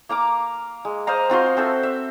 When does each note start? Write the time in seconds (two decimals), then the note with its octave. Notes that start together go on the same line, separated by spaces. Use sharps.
0.09 A#3 F5 A#5 D6
0.85 G#3
1.07 C5 D#5 F5 A#5
1.30 C4 F4 F#4 C6
1.57 C4 A4 E5
1.83 E5